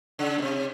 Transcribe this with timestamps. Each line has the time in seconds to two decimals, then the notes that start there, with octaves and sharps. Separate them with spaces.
0.19 C#3
0.38 B2
0.42 C3